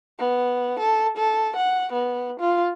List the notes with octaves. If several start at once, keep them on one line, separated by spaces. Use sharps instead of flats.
B3
A4
A4
F#5
B3
F4